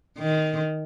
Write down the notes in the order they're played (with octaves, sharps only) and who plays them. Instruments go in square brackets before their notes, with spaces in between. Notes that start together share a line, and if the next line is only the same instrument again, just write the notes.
[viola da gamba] D#3